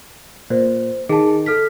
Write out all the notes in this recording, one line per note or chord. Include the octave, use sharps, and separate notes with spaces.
A#2 C5
D#3 G#4 A5
A4 F6 B6